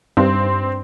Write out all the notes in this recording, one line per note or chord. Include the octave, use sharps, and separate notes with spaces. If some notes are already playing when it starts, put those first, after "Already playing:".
G2 C4